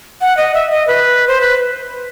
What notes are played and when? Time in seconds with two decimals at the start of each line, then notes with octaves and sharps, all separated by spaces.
0.21 F#5
0.37 D#5
0.54 E5
0.71 D#5
0.87 B4
1.28 C5
1.41 B4